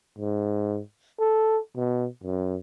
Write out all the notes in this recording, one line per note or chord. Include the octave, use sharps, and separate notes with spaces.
G#2
A4
B2
F#2